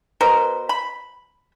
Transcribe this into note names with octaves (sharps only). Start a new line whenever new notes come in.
B2 B3 A#4 C5
B5